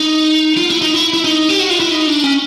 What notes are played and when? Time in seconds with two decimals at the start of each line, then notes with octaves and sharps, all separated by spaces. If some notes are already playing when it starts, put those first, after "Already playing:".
Already playing: D#4
0.57 F4
0.70 E4
0.82 D#4
0.94 E4
1.14 E4
1.24 D#4
1.49 G4
1.59 F#4
1.70 F4
1.80 E4
1.91 D#4
2.07 D4
2.24 C#4